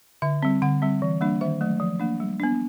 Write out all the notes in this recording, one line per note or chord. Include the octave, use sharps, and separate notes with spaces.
D3 E5
G3 C4
D3 F#5
G3 C4
E3
G3 A#3 D4
D#3 E5
F#3 A3
F3
A#3 D4
G3
B3 D4